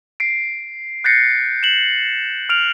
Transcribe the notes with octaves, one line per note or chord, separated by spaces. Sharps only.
C7 D7
F#6 G6 A6 A#6 C7 C#7
E7 F#7
F6 D7 F7